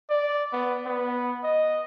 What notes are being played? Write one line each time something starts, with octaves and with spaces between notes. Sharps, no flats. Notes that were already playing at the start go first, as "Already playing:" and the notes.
D5
B3
B3
D#5